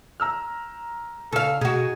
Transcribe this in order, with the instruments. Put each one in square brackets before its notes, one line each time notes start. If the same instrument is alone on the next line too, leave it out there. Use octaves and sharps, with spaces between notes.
[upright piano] A#5 E6 F6
[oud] C#3 F5 [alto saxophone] A4
[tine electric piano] B2 [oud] D#4 F#4 [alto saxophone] G#4